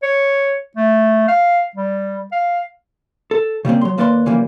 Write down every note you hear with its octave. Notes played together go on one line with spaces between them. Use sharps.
C#5
A3
F5
G3
F5
A4
C#3 G3 A#3 C4
F#3 C6
D#2 A#3 B4 D5 G#5 C6
C#3 E3 F3 G3 A#3